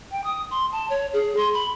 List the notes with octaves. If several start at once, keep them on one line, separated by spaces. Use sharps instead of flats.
G5
D#6
C6
A5
C#5
G#4
C6
B5